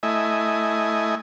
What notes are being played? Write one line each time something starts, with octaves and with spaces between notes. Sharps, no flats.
A3 E4 D#5 G#5